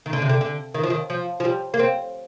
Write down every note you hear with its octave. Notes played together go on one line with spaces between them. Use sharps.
D#3
D3
C3
D3
D3
D#3
F3
D#3
F3
F3
G3
A#3
C4